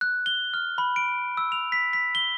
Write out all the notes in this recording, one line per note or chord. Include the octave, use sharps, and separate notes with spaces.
F#6
G7
F6
B5
D7
E6
F7
B6
B6
G7